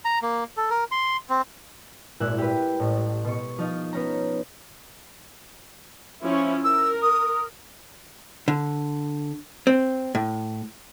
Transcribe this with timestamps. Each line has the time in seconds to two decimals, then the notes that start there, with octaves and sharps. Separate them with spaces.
0.05 A#5
0.22 A#3
0.57 A4
0.70 A#4
0.91 C6
1.29 C4
2.20 G#1 A#2 E4 E5 F#6
2.38 G4 B4
2.80 A1 A2
3.25 B2 C#6
3.58 F3 D#4 F4
3.93 B3 C#4 A#5
6.23 F3 C#4 E4
6.64 A#4 E6
7.02 D#6
8.48 D3
9.67 C4
10.15 A2